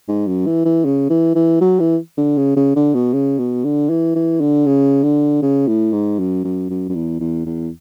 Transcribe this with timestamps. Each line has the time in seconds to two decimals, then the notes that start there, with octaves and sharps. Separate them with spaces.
0.08 G#2
0.27 F#2
0.46 E3
0.65 E3
0.85 C#3
1.10 E3
1.35 E3
1.61 F#3
1.80 E3
2.18 D3
2.37 C#3
2.57 C#3
2.76 D3
2.94 B2
3.13 C#3
3.39 B2
3.64 D3
3.90 E3
4.15 E3
4.41 D3
4.66 C#3
5.04 D3
5.42 C#3
5.68 A2
5.93 G#2
6.19 F#2
6.44 F#2
6.70 F#2
6.89 F#2
6.95 E2
7.20 E2
7.46 E2